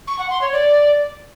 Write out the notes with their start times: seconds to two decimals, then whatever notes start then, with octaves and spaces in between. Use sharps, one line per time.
0.07 C#6
0.19 F#5
0.30 C6
0.41 C#5
0.53 D5